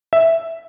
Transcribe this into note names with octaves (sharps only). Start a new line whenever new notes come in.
E5